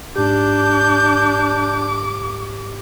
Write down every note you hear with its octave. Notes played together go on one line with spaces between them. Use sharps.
G#2 D4 G4 D6 G6